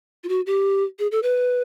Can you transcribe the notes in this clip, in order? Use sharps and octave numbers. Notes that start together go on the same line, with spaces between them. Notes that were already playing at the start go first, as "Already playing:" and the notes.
F4
F#4
G4
G#4
A4
B4